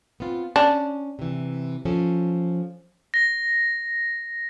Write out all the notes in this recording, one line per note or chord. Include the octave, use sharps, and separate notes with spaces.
B3 C4 F4
C#4 D4
C3 E3
F3 C#4 A4
A#6